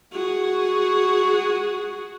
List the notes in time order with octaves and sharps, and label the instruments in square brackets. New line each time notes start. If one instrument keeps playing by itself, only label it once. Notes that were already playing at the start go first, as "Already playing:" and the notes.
[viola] F#4 G#4